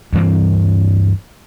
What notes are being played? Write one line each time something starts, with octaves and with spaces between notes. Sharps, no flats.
D2 G2 E3 C4